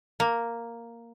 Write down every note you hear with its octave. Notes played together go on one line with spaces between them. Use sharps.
A#3